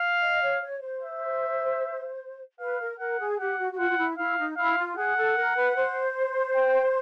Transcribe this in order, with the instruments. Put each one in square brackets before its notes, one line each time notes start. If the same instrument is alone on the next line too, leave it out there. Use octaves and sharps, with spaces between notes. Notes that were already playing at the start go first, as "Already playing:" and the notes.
Already playing: [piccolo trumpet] F5
[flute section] D#5
C#5
C#5
C5
[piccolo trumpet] E5
[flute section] B4 [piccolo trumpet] F5
[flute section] A#4
[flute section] A#4 [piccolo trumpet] F#5
[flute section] G#4
[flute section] G4 [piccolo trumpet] F#5
[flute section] F#4
F#4
[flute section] F4 [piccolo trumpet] F#5
[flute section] F4
E4
[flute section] E4 [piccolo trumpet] F5
[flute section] D#4
[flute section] E4 [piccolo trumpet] F5
[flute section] F4
[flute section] G#4 [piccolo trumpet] F#5
[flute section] A4
A#4
B4
C5
[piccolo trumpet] G5